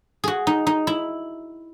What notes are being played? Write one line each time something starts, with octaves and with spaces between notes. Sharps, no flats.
F#4 G#4
D#4
D#4
E4